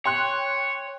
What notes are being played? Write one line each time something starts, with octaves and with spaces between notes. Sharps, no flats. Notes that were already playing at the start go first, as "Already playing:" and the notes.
C#5 G5 C6 F#6